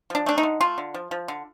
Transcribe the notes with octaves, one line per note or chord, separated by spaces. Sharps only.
F3 D4
A3 D4
D#4
D3
A3 F4
D3
F3
F3
D3